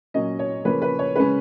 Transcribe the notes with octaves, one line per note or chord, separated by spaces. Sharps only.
A#2 F#3 C#4 D#5
C#5
C#3 F3 A#3 C#4 B4
B4
C#5
C#3 G#3 C#4 B4